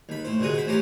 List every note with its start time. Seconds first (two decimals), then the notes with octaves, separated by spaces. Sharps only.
0.09 D#2 B5
0.25 A2 C5
0.40 C2 A#2 D3 G#3 F#4 D#6
0.54 C5 B5
0.67 A1 E3 C#4 G4 A#5 C6